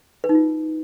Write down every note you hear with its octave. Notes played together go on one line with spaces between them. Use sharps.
B4
D#4
F4